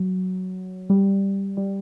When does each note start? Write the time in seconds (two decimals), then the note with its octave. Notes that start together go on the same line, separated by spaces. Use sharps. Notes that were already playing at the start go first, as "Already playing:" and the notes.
Already playing: F#3
0.90 G3
1.57 G3